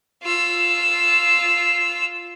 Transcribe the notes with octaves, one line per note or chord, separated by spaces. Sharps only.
F4 E6